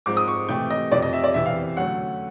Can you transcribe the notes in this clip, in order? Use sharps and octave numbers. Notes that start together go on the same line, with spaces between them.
G#2 F3 G#3 C4 D6
D#6
C#6
C3 E3 A3 G5
D#5
F2 C3 F3 D5
D#5
E5
D5
E2 C3 E3 E5
F5
D3 F#3 A3 C#4 F#5